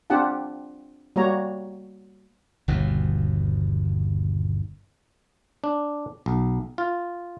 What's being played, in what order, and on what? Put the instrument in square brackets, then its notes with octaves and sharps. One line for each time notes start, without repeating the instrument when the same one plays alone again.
[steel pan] C4 D4 F4 G4 F#5 A5
G3 A#3 F#4 C#5 A#5
[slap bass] G1 D#2 B2
[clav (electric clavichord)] D4
B1
F4